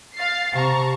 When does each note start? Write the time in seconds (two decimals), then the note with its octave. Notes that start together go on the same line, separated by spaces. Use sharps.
0.16 F5 A6 C7
0.54 C3 A5 A#5 C#6